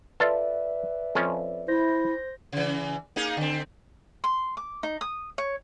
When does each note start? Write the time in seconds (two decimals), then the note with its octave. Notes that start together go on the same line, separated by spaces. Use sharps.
0.20 F4 A4 B4 D5 E5
1.15 F2 F3 C#4
1.68 E4 C5 G6 A#6
2.52 C#3 E3
3.16 A#3 D#4 G#4
3.37 D3 C4
4.24 C6
4.57 D6
4.83 D#4
5.01 D#6
5.38 C#5